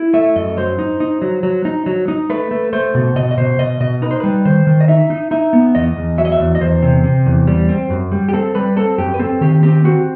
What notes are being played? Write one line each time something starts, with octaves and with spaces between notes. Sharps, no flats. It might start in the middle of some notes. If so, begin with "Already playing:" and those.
Already playing: E4
A3 E5
F#2 D#5
F#3 C5
D#4
D#4
F#3
F#3
D#4
F#3
D#4
A3 B4
A3
A3 C5
B2
B2 D#5
D#5
B2 C5
B2 D#5
B2 D#5
D#4 B4
C5
G3 B4
D#3 C5
D#3
D#5
D#4 E5
D#4
D#4 E5
B3
E2 D#5
E2
F#3 E5
D#5
E5
E2
D#5
E2 C5
C3
C3
E2
G3
C4
F#2
G3
G4
C4 A4
G3 B4
C4 A4
F#2 G4
B4
C4 A4
D#3 G4
C4 G4
C4 F#4